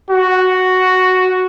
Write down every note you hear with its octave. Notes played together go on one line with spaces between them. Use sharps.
F#4